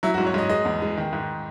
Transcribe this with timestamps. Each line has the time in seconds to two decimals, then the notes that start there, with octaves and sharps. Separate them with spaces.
0.03 F#3 E4
0.14 F#4
0.18 G#2
0.26 C#5
0.34 G#2 D#5
0.49 G#3 D#5
0.65 E2
0.82 G#3
0.98 D#3
1.13 G#2